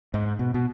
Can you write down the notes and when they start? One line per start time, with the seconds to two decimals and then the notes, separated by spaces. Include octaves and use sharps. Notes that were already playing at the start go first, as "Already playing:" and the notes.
0.14 G#2
0.39 B2
0.54 B2